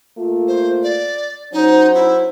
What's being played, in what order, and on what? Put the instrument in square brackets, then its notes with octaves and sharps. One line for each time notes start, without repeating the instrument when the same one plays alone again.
[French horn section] A3 A#3 F4
[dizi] C5
D5
[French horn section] F#3 C#4 C5 [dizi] D#4
[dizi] E4